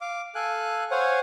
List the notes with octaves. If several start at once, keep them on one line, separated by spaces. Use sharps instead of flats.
F5 D6
A4 F5 G#5 F#6
C5 C#5 F5 F#5 G#5